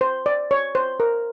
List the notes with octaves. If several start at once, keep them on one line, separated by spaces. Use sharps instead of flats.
C5
D5
C#5
C5
A#4